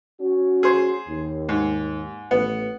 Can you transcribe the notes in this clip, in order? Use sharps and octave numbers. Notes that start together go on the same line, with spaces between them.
C#4 F#4
G#4 C5
D#2
G#2
A1 B3